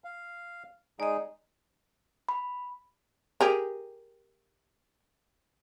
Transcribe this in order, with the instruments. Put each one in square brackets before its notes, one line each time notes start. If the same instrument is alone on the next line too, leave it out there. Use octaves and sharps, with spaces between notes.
[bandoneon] F5
[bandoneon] G#3 D#4 G#4 [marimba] D5 D#5
[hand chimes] B5
[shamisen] G4 G#4 A#4